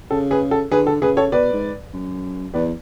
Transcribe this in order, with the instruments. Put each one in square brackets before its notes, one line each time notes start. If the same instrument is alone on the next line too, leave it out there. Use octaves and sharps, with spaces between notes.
[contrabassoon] C#3 [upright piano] A4
[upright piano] G#4 B4
A4
[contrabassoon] D3 [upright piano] G#4 B4
[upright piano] A4
[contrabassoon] C#3 [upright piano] G#4 B4
[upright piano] A4 C#5
[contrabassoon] B2 [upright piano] B4 D5
[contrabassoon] G#2
F#2
[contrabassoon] E2 [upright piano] B4 D5